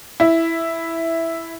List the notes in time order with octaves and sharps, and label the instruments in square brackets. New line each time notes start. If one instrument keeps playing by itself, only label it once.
[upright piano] E4